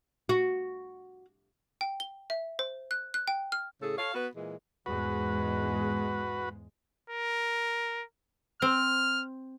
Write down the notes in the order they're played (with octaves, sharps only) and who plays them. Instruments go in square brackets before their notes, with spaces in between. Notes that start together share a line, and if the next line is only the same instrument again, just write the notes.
[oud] F#4
[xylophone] G5
G7
E5
C5
F#6
F#6
G5
F6
[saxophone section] A2 C#3 G#4 A4
A4 C#5 F5
B3 F#4 B4
A#2 E3 G#3
[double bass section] E2 G#2 G#3 [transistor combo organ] F#4 B4
[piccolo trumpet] A#4
[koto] C4 [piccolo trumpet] F6